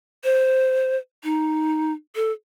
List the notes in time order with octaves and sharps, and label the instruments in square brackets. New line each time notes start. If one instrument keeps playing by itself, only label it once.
[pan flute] C5
D#4
A4